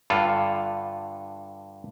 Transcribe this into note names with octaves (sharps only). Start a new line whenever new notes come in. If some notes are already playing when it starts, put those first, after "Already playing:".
G2 D3 F4 A4